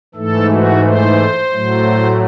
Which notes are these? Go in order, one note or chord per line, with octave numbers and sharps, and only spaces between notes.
G#2 E3 A3 A4
F#4
C5
A2 F#3 A3